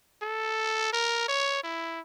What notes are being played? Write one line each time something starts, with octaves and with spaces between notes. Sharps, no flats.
A4
A#4
C#5
E4